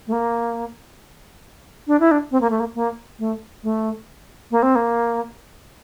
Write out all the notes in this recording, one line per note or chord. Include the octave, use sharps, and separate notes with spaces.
A3
A#3
D4
E4
D4
C4
A#3
A3
A#3
A#3
A3
A3
A#3
C4
A#3